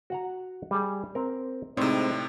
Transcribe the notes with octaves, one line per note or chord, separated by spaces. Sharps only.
F#4 F#5 A#5
G3 G#4
C4 A#4
A2 C3 G#3 C4 D#4 D5